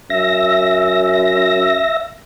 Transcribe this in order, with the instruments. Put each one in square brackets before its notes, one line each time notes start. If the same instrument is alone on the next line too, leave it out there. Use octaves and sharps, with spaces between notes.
[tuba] F#2 [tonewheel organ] E5 A#6